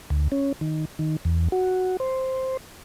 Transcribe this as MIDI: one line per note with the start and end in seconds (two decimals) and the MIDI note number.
0.10 0.28 38
0.32 0.53 61
0.61 0.85 51
0.99 1.16 51
1.25 1.48 40
1.52 1.97 66
2.00 2.57 72